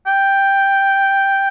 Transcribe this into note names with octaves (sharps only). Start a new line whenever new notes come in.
G5